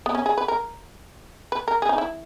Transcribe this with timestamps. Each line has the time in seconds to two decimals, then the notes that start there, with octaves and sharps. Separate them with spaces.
0.06 B3
0.15 C#4
0.26 G#4
0.38 B4
0.48 A#4
1.52 B4
1.68 A#4
1.82 G#4
1.89 D#4
1.98 E4